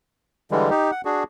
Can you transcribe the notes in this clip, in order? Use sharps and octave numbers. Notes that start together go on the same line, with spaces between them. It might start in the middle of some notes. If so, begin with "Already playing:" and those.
D3 E3 G3 G#3
D#4 G4
F#5
D4 F#4 G#4